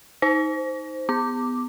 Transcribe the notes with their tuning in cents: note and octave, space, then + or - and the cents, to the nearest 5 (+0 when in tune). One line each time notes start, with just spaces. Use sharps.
D#4 +20 C5 +0
B3 +15 D6 +0